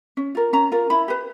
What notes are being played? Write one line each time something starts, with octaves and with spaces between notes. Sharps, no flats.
C#4
F4 A#4
C#4 A#5
F4 A#4
E4 B5
G4 B4